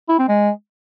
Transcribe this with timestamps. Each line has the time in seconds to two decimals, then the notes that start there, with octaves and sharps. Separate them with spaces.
0.09 E4
0.19 C4
0.29 G#3